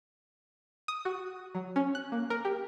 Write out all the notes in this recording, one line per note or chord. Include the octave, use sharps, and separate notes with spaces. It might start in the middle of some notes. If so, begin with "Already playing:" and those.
D#6
F#4
F#3
C#4
F#6
A#3
A#4
G4